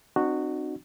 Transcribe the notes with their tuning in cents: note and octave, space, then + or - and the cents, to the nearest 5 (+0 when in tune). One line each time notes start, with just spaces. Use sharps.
C4 +0 D#4 -40 F#4 +0